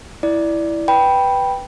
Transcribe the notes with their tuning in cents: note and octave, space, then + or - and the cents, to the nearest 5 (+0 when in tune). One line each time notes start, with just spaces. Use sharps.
E4 +0 D5 +0
B4 +0 G5 +0 B5 -10